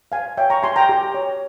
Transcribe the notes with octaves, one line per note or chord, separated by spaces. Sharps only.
C5 F5 G#5
C#5 E5 G5
A#5 C#6
G4 G#5 C6
G5 A#5
G4
C#5